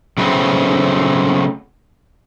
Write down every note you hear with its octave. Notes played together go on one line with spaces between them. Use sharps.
C#3 F#3 A3 B3 C4